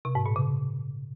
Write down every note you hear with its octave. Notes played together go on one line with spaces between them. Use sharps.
C3
G#2
A#2
C#3